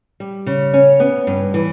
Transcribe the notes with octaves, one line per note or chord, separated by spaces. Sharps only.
G3
C#3
C#4
B3
G2
E3